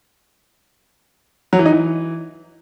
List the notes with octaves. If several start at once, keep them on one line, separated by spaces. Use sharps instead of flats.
F#3
E3
D#4
E3